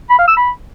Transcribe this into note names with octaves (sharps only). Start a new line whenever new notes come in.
B5
F5
E6
B5